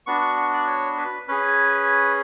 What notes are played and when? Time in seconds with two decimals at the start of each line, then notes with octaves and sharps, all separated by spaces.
0.06 B3 D4 F#4 C#6
0.22 C#6
0.37 C#6
0.53 D5
0.67 C#5
0.98 B4
1.28 C#4 G#4 B4